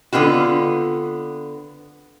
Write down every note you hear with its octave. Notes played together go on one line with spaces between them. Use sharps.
D3 B3 C4 F4 F#4